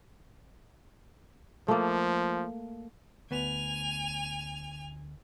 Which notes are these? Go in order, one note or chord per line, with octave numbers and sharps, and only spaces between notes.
F3 A3 A#3
D2 B3 G#5 F7